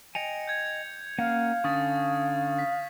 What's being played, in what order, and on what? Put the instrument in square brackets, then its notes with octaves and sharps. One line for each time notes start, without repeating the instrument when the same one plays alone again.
[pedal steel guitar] D#5 G5 G#5 [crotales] C#7 F7
[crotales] G6 G#6
[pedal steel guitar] A#3 C#4 F#5 [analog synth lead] F5
[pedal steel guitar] D3 C#4 [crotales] C#6 D#6 A6
[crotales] B6